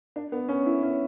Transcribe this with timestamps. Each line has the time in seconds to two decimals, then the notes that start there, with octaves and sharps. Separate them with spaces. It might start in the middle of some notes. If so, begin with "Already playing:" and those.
0.16 D4
0.32 B3
0.49 C#4
0.66 E4
0.83 C#4